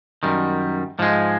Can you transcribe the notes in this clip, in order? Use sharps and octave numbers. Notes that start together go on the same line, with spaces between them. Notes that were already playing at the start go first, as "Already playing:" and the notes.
F#2 D#3 G3
G#2 F3 G#3